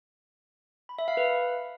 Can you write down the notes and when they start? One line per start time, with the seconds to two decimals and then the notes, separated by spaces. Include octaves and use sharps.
0.89 B5
0.99 E5
1.08 F5
1.17 B4